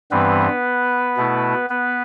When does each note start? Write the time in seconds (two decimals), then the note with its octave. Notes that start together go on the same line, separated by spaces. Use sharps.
0.11 G2 E3 G3 B3 C4 B4
1.17 B2 A3 E4
1.70 B3 B4